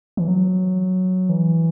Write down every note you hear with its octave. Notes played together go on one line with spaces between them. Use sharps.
E3
F#3
E3